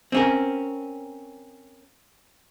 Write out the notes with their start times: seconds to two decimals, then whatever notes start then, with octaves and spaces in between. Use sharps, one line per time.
0.12 C4 C#4 A#4